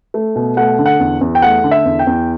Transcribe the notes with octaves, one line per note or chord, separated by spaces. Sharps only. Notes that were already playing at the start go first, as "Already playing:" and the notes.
A3
B2
A3 F#5
D3
F#5
E2
E2
G5
A3 F#5
D3
E5
E2
G5
E2